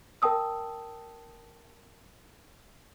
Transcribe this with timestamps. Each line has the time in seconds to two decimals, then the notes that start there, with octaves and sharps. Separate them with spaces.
0.22 A#4 G5 A5 D#6 E6